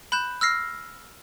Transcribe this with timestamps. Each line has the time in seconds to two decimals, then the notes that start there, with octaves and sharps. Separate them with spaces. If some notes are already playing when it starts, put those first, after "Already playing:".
0.12 B5 F#6 G6 E7
0.41 E6 F6 A#6 C7